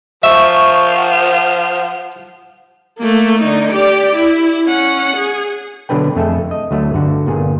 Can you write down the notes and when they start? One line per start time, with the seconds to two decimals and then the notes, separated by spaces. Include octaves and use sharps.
0.23 F3 E5 C#6
0.96 F#5
2.99 A3 A#3
3.39 D3 D#4
3.72 G4 D5
4.15 E4
4.66 C#4 F#5
5.16 G#4
5.89 B2 D3 F#3 D4 B4 G5
6.16 F2 A3 G#4 A4 E5 G5
6.51 D#5
6.71 D2 F#3 A3
6.93 G1 D3 F#4
7.26 G1 A#2 G#4